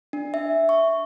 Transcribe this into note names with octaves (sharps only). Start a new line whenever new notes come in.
D4
E5
C#6